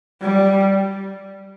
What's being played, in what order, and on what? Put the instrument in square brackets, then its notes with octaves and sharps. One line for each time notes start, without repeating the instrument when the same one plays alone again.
[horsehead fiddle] G3